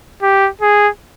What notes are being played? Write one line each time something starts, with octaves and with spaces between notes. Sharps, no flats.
G4
G#4